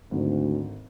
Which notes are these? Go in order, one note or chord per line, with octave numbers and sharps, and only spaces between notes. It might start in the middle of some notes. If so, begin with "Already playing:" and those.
G#1 D2